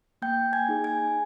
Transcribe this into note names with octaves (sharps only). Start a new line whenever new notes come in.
A#3 G5 G6
G#5 G#6
D#4 G#4
G#5 G#6